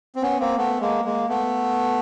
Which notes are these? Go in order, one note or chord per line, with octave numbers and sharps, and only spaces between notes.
C4
B3 C#4
A#3 C4
A3 B3
G#3 A#3
G#3 A#3
A3 B3